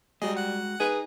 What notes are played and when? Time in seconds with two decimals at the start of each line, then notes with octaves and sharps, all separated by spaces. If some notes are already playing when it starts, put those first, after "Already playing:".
0.22 G3 G#3 F#4 G#4 D#5
0.37 F#5 F#6
0.80 D#4 G#4 B4 D#5